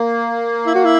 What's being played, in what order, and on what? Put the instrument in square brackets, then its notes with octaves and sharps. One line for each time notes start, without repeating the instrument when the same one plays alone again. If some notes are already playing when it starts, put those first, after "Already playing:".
Already playing: [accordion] A#3
[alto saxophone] E4
F#4
E4